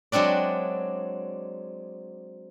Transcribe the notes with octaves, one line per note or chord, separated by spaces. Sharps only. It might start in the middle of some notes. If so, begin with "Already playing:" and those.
F#3 G#3 C4 D4 D5